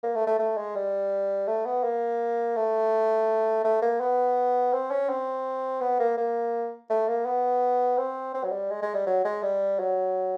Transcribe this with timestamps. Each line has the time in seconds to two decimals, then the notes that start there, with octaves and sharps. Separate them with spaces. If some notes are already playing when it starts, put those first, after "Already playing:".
0.03 A#3
0.15 A3
0.27 A3
0.39 A3
0.57 G#3
0.75 G3
1.48 A3
1.65 B3
1.84 A#3
2.56 A3
3.64 A3
3.82 A#3
4.00 B3
4.73 C4
4.91 C#4
5.09 C4
5.81 B3
5.99 A#3
6.17 A#3
6.90 A3
7.08 A#3
7.26 B3
7.98 C4
8.34 C4
8.44 F#3
8.52 G3
8.70 G#3
8.82 G#3
8.94 G3
9.06 F#3
9.25 G#3
9.42 G3
9.79 F#3